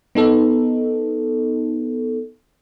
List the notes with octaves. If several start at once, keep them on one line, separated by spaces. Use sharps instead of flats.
B3 D#4 A4